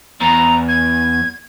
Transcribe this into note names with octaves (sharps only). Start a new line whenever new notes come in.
E2 A#5
G#6